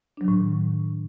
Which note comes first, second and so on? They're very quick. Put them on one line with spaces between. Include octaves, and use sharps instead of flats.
D4 F#3 D#3 A2